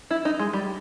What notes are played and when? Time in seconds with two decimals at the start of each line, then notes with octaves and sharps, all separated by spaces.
0.11 E4
0.25 D#4
0.39 G#3
0.53 G3